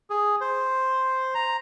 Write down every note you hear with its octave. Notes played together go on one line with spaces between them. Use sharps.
G#4
C5
A#5